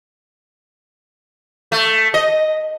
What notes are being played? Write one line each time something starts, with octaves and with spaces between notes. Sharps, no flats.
A3
D#5